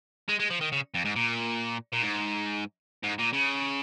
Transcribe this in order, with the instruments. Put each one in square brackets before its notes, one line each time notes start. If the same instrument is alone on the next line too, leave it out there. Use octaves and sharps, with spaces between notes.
[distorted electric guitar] G#3
G#3
F3
D#3
C#3
F2
G#2
A#2
A#2
G#2
G#2
A#2
C#3